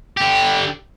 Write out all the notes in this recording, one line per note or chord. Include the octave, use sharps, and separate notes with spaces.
D3 G4